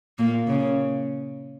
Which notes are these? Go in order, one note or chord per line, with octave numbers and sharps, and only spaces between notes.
A#2 A#3
C#3